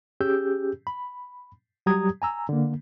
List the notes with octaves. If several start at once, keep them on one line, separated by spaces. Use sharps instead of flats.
C#4 G4 G#4 E6 G6
B5
F#3 G3 G4 A#5 D#6 G#6
G#5 A#5 E6
D3 A#3